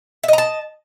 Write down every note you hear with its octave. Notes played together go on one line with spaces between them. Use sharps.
D#5 E5 A5 A#5